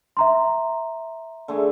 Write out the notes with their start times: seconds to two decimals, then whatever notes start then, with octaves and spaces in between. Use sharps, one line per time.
0.17 E5 A#5 C6
1.48 D3 A3 G#4